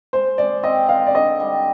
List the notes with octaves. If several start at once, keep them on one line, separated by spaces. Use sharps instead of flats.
G#3 C5
G#3 D5
C4 D#5
D#4 F5
D5
D3 D#5
G3